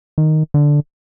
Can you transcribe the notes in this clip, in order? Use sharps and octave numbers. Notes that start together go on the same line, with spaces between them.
D#3
D3